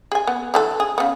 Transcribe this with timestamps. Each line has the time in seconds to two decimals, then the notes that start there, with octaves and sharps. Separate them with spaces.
0.12 G#4 G#5
0.27 B3
0.54 D3 E3 A4
0.80 G#4
0.98 C#3 B3